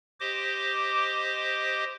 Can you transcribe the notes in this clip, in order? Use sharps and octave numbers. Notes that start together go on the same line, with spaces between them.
G4 C5 D#5 D6